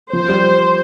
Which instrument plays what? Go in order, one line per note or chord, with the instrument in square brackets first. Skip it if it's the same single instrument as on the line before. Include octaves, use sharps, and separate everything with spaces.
[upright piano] F3 [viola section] C5
[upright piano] G3